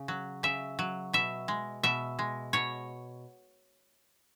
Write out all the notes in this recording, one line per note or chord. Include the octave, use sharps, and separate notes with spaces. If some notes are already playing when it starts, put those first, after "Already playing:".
Already playing: C#3
F#3
C#3 E5
F#3
B2 E5
G#3
B2 E5
G#3
B2 C#5